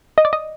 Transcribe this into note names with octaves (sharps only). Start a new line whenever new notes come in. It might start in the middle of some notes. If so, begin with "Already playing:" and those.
D#5
D5
D#5